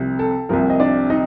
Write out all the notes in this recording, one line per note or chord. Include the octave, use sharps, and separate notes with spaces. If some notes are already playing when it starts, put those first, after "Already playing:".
Already playing: C2 C3 F3
A4
C2 C3 F3 A#3 A#4
D#5
D4 D5
D#4 D#5